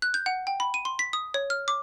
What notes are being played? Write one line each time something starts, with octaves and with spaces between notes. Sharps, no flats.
F#6
G6
F#5
G5
B5
D#7
C6
B6
D#6
C#5
F6
D6